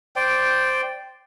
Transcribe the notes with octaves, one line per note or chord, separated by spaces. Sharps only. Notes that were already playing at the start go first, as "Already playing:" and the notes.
C5 D5 G5